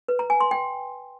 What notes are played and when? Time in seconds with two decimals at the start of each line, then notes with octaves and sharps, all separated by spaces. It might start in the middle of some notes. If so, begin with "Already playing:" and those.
0.08 B4
0.19 A#5
0.30 G#5
0.41 C6
0.51 G5